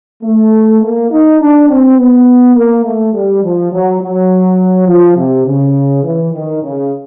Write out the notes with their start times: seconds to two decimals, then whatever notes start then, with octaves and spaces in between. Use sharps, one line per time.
0.24 A3
0.82 A#3
1.11 D#4
1.40 D4
1.69 C4
1.97 B3
2.56 A#3
2.85 A3
3.14 G3
3.43 F3
3.72 F#3
4.01 F#3
4.88 F3
5.17 C3
5.46 C#3
6.04 E3
6.34 D#3
6.62 C#3